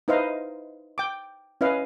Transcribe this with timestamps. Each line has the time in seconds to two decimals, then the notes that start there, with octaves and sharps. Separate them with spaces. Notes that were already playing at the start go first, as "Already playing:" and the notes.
0.08 D#4 E4 B4 C5 D#5 F5
0.98 G5 D6
1.61 C#4 E4 B4 D#5 F5